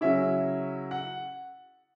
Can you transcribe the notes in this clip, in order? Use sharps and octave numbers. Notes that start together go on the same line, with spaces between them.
C#3 F#3 C#4 E4 E5
F#5